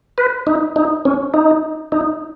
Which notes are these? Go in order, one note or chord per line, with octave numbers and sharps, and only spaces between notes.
B4
D#4
D#4
C#4
D#4
D#4